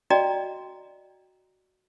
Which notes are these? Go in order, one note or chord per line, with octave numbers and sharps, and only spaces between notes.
F#4 D5 D#5 G5 A#5